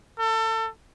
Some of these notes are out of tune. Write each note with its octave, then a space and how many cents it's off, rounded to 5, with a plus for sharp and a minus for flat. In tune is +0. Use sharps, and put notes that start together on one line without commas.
A4 +30